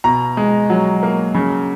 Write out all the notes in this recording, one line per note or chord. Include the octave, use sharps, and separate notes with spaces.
B2 A#5
G#3
F#3
A#3
C#3